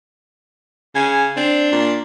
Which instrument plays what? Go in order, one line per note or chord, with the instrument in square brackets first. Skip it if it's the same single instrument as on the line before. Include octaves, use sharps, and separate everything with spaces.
[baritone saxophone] C#3 [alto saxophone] G#5
[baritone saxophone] C4 [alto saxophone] D4
[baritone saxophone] A#2